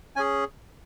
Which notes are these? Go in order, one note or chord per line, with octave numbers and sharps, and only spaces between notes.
C#4 G#4 G#5